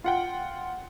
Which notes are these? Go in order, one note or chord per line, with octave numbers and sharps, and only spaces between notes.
F4 F#5 G5